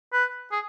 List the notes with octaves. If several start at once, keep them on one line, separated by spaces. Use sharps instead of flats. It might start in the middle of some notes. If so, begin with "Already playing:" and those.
B4
G#4